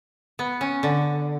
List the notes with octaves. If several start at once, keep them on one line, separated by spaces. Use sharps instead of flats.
B3
C#4
D3